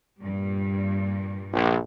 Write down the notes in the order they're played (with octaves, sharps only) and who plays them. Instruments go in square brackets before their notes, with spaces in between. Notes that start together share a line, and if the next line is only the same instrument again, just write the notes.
[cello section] G2 A#2 G3
[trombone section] A#1